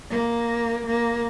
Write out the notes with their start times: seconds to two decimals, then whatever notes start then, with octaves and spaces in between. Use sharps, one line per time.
0.10 A#3
0.86 A#3